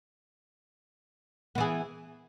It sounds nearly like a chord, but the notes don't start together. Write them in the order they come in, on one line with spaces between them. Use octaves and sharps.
B3 E3 G#4